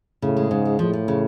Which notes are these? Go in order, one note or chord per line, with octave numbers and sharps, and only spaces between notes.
A2 C#3
G#3
G#2 C#3
G#3
A2 F3
F3
C#3